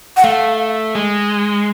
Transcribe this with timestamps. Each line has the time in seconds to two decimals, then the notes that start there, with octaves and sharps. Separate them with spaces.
0.17 F#5
0.24 A3 F5
0.95 G#3